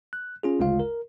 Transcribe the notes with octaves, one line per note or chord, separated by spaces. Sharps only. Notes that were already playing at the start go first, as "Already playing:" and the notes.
F#6
C#4 F4 G#4
G1 D2 C#3 G#3 F4 F5
A#4